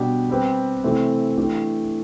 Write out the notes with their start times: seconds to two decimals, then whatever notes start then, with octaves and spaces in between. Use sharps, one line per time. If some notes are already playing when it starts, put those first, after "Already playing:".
Already playing: B2 G3 D4 G4
0.29 G3 C4 G4 B4
0.84 C3 E3 A3 C4
1.37 E3 A3 D4 G4